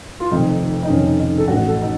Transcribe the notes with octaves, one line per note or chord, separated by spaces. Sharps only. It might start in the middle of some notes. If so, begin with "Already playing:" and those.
F4
F1 F2 D#3 D#4
D#4
F1 F2 D#3 C#4
D#4
A4
A1 A2 F#4
A4
D#4